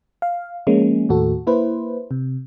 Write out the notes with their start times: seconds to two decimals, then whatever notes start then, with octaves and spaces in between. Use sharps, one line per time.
0.22 F5
0.67 F3 G#3 A#3 C#4
1.09 D#2 A2 F#4 A4
1.47 A#3 E4 B4 C5
2.11 C3